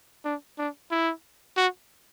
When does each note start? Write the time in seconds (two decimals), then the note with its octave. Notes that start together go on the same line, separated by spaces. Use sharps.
0.25 D4
0.58 D4
0.91 E4
1.57 F#4